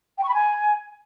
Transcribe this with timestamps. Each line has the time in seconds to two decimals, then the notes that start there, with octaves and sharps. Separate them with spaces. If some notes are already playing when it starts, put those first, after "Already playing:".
0.17 G5
0.23 C#6
0.28 B5
0.33 G#5